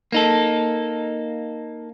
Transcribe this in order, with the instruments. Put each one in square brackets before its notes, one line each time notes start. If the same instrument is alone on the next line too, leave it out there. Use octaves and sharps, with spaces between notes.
[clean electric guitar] A#3 D#4 A4